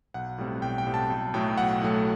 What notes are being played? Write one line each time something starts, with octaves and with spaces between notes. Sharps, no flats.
B1 F#5
A2 G3 C4
B1 G5
G5
A2 G3 C4
A5
B1
A2 F#3 A3 G5
B1 F#5
A2 F#3 A3